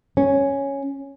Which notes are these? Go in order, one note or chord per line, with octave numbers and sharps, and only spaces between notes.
C#4